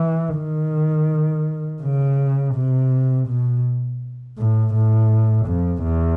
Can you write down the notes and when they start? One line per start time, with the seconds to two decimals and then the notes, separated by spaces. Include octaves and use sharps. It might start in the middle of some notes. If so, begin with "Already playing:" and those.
Already playing: E3
0.37 D#3
1.82 C#3
2.55 C3
3.28 B2
4.38 A2
4.74 A2
5.46 F2
5.82 E2